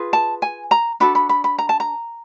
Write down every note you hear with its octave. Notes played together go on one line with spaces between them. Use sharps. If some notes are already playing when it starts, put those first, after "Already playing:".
Already playing: F4 G#4 B4
A5
G#5
A#5
D4 F#4 A4 B5
B5
B5
B5
A#5
A5
A#5